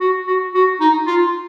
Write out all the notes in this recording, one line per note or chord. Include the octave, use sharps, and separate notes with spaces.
F#4
F#4
F#4
D#4
F4